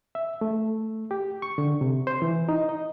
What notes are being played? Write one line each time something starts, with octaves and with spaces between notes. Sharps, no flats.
E5
A3
G4
C#6
D3
C3
C5
E3
D#4
D#5